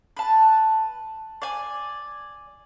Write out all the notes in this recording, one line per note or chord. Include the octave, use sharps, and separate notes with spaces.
B4 A5
D5 G#5